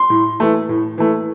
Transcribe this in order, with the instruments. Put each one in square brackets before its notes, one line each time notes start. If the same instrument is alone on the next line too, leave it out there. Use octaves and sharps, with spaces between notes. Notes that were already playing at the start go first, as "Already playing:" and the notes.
Already playing: [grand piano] C6
A2
E3 A3
A2
E3 A3